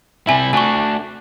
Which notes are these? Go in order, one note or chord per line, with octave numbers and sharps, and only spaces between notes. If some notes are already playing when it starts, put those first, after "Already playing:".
C3 G3 E4 E5 G#5 B5
A3 D4 F#4 G#5 C#6